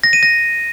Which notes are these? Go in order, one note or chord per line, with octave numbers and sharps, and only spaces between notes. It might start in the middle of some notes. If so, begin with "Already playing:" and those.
A#6
D#7
A#6